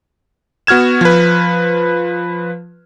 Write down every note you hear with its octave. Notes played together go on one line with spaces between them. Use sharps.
B3 F#4 F6 G#6 E7
F3 B4